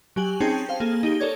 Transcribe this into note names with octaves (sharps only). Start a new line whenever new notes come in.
F#3 G4 G#5 F#7
C4 C#4 D#4 G#4 G5 A5
C5 F5
A#3 G#4 A4
D#4 G4 G7
A4 A#4 C#5 D5 G#6